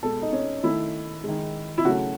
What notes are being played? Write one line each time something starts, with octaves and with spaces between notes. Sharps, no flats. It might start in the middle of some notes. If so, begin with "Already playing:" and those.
B2 G#3 A4
D#4
C#4
D#3 A3 E4
D#3 G#3
E4
C#3 F#3 A3 F#4